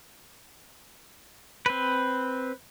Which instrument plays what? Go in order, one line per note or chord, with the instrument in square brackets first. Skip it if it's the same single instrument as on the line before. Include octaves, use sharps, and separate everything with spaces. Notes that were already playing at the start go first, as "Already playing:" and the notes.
[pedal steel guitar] C4 B4